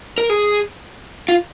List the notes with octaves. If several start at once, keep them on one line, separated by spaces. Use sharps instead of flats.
A#4
G#4
F4